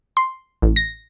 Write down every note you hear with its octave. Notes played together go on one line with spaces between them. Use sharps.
C6
A1
A#6